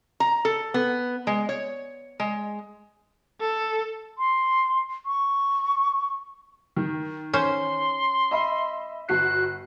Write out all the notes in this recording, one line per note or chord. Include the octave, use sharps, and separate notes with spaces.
A#5
A4
B3
G#3
C#5
G#3
A4
C6
C#6
D#3
C#4 C5 C6
D#5 E5 B5
G1 F#4 F#6 C7